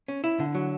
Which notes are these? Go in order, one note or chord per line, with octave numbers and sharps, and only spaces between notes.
C#4
E4
D3
F#3